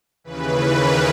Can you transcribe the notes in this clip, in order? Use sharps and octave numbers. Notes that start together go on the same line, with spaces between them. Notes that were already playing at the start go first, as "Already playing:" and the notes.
D#2 C#3 E3 B4
A#4